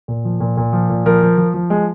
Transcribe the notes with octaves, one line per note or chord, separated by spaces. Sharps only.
A#2
F3
A#2
A#2
F3
A#2
F3 A#4
F3
F3
F3
G#3